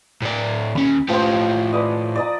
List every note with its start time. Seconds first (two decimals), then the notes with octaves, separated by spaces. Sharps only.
0.22 A2 D5
0.75 D#2 C#4 B5
1.09 A2 F3 G4 C5
1.73 B4 D5 D#5
2.15 D5 D#5 A#5